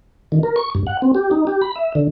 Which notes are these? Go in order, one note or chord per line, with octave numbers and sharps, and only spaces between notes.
D#3
A#4
C#6
G2
F#5
C4
G4
D#4
G4
B5
E5
D3